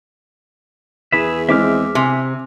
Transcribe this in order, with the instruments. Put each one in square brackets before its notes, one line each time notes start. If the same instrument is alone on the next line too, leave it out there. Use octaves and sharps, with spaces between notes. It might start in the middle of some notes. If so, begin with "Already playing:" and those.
[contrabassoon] E2 [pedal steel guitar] G#4 B4 E5
[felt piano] E3 G#3 C4 [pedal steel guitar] E5 D6 F6
[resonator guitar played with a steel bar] C3 [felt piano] G#5